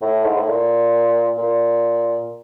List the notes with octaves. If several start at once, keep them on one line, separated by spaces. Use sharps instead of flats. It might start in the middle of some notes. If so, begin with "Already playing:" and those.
A2
G#2
A2
A#2
A#2